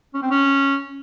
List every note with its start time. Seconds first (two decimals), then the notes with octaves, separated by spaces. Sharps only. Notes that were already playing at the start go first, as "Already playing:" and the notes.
0.14 C#4
0.22 C4
0.31 C#4